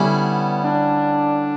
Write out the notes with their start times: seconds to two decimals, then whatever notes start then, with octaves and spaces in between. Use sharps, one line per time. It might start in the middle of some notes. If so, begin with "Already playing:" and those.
Already playing: D3 G3 B3 C#4 E4
0.64 D4